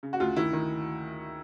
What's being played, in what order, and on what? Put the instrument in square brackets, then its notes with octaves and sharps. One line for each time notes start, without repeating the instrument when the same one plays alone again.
[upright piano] C#3
F#4
D2 F4
D#3 E4
D#3